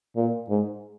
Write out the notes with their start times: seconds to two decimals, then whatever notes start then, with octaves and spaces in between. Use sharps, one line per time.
0.16 A#2
0.49 G#2